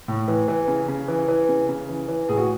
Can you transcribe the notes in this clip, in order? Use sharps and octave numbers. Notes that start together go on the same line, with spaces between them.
A2
E3
E3
C#3
C#3
E3
E3
C#3
C#3
E3
E3
A2 G#4
F#4